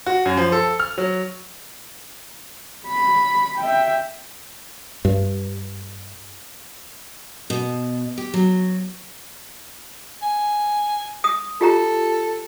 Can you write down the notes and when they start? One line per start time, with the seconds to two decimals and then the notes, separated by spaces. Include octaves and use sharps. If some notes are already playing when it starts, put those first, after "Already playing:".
0.06 F#4
0.26 F#2
0.37 F3
0.52 A4
0.80 F6
0.98 F#3
2.87 B5
3.59 E5 G5
5.05 G2
7.50 B2
8.18 G4
8.34 F#3
10.23 G#5
11.24 D#6
11.61 F4 G4 A4 A#5